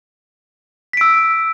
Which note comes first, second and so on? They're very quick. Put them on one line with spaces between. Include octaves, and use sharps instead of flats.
B6 D7 E6